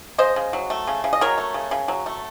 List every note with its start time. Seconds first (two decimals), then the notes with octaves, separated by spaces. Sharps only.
0.18 C#3 C5 D#5
0.36 C#3
0.53 F#3
0.70 A3
0.87 C#3
1.04 C#3
1.13 D#5
1.21 F#3 A#4 C#5
1.38 A3
1.54 C#3
1.71 C#3
1.88 F#3
2.06 A3